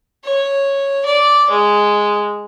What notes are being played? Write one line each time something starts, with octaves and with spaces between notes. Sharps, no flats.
C#5
D5
G#3